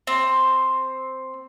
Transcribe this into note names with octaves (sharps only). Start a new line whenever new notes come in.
C4